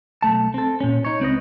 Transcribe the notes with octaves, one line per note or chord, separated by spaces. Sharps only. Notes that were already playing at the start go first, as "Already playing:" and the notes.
B1 G#2 A3 A5
C4 A4
A#2 C#4
D#4 C#5
C#2 C4 B4 D#5